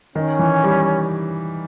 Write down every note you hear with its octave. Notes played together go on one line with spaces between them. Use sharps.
D#3 C#4
E3
G3